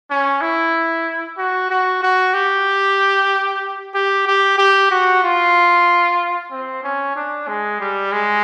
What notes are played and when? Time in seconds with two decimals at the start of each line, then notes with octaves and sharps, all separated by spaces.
0.10 C#4
0.41 E4
1.38 F#4
1.70 F#4
2.03 F#4
2.34 G4
3.95 G4
4.27 G4
4.58 G4
4.91 F#4
5.24 F4
6.51 C4
6.84 C#4
7.16 D4
7.48 G#3
7.80 G3
8.12 G#3